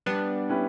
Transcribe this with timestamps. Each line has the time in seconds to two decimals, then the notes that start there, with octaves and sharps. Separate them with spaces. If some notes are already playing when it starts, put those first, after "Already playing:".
0.06 G3 B3 D4
0.49 C#4 E4 G4 B4